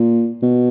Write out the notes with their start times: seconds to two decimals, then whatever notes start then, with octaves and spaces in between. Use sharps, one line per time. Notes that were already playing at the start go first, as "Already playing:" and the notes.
Already playing: A#2
0.42 B2